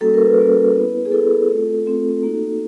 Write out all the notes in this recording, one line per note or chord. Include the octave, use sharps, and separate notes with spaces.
G3 A#3 C#4 F#4 A4
A#4
B4
G3 A#3 C#4 F#4
B3 E4
G#4
B3 E4 A4
A3 C4 F4
A3 C4 F4
A#3 D#4 F#4